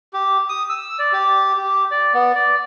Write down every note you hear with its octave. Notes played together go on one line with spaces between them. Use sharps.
G4
D#6
E6
D5
G4
G4
D5
B3
D5